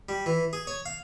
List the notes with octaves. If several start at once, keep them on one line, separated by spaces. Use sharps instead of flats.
G3
E3
G#4
C#5
F5